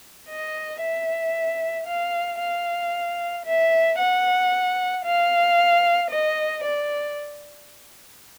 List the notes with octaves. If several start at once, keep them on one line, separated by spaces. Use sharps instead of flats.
D#5
E5
F5
F5
E5
F#5
F5
D#5
D5